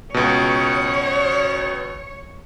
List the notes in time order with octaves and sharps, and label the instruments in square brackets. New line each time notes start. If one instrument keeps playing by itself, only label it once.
[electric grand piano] C#2 B2 [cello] C#5